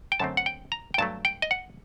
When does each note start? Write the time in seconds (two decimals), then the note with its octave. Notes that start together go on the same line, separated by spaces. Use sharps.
0.12 G5
0.20 F#2 D3 A3 C4 A5
0.37 F#5
0.46 G5
0.72 A#5
0.94 G5
0.98 G2 F#3 A3 A5
1.25 G5
1.42 D#5
1.51 F#5